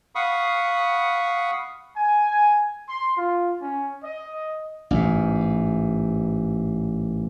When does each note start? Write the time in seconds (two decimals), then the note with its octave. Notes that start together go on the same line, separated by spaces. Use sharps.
0.15 F5 F#5 B5 C#6 D#6
1.95 G#5
2.87 C6
3.17 F4
3.62 C#4
4.03 D#5
4.91 A1 G#2